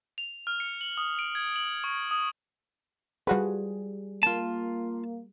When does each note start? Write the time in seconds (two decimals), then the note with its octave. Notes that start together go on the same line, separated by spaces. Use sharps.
0.18 F7
0.47 F6
0.60 C#7
0.81 F#7
0.97 D#6
1.19 D7
1.35 G#6
1.56 F#7
1.84 C#6
2.11 D#6
3.27 F3 G3 F#4 G#4 B4
4.23 A#3 F4 A5